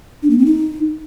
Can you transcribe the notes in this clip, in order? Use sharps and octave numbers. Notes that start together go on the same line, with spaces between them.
D4
A#3
C4
D#4